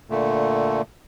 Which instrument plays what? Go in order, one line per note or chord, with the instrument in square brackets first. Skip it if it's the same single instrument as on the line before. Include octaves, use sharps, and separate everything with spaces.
[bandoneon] A#2 D3 A3